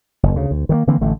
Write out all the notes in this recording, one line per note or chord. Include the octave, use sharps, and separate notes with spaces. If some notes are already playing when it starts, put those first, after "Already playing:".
F#1 E2
D2 C#3
D2
D#3 G3 A#3
D3 E3 A#3 C4
A1 D3 A3